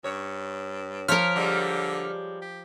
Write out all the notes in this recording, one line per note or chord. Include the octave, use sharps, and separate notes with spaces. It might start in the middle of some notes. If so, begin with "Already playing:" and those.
G2 C#5
F3 A#4 C#5 F6 B6 C#7
D3 G3 G#3
G4